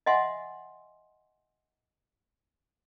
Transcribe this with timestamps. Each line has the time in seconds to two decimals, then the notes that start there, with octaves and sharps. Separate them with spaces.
0.06 D#5 E5 F#5 G#5 C6